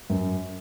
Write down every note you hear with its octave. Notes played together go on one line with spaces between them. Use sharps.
F#2